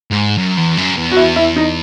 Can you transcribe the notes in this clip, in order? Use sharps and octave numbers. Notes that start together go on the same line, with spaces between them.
G#2
F#2
E2
F#2
E2
F#4
E4
E4
D#4